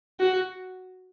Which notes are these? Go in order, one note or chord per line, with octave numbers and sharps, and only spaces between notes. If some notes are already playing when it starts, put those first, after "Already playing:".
F#4